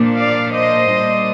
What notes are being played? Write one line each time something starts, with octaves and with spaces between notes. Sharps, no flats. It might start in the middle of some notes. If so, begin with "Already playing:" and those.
Already playing: A#2 F3 A#3 D4
D5 F5
C5 D#5
A#2 G3 A#3 D4